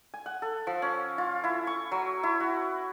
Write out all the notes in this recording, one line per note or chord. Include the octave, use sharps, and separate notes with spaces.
G#5
F#5
A4
F3
C#4
F4
E4
C#6
F#3
E4
F#4